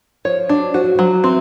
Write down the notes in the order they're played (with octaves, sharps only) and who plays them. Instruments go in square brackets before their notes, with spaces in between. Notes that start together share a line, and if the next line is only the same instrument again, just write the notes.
[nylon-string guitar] F3 [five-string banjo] C#5
[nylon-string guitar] F#3 [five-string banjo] D4
[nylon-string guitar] F3 [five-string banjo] F#4
[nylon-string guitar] F#3
[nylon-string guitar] F3 [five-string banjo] F#3
[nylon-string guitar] E3 [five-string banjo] C4